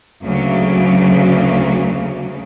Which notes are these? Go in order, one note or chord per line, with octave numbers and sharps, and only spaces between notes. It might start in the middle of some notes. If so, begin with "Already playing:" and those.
D2 C#3 F#3 A#3